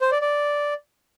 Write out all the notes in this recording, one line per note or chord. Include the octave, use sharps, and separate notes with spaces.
C5
D5
D5